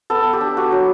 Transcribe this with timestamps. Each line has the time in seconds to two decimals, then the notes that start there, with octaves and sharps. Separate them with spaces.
0.10 B3 A4
0.33 G4
0.41 D4
0.57 F#4
0.72 F#3